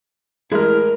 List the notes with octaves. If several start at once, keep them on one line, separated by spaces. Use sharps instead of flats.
A1 G#3 E4 A#4 F6